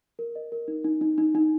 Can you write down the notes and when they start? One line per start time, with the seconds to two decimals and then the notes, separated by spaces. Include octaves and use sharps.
0.19 A#4
0.35 D#5
0.52 A#4
0.68 D#4
0.84 D#4
1.01 D#4
1.18 D#4
1.35 D#4